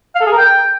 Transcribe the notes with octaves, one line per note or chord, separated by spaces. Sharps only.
F5
A4
G#4
A#4
G5